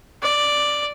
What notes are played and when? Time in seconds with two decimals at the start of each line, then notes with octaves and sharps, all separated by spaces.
0.22 D5